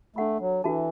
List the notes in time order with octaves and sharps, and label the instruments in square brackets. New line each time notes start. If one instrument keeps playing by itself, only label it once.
[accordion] A3 [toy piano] D4 A4 F#5 B5
[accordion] F#3
[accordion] E3 [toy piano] D4 F#4 A4 E5 A5